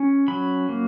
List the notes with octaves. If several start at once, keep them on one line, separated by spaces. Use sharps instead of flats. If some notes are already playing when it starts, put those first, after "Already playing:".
Already playing: C#4
F#3 B5
A#3